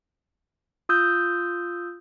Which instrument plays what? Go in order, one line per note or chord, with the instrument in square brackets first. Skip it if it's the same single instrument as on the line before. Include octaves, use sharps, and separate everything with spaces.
[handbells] F4 D#6 E6 G6